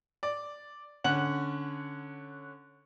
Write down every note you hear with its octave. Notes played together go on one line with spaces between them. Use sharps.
D5
D3 C#4 F#5 F#7